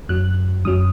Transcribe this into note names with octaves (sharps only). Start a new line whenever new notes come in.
F#2 F#3 F#6
F#2 F#3 D#6